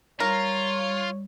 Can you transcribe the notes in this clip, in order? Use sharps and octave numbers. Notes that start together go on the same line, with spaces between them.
G3 F4 A#4 C#5